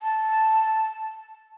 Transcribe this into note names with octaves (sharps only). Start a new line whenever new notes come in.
A5